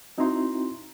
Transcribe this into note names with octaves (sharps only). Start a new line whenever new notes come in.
C4 D#4 E4 F#4 A#5 C6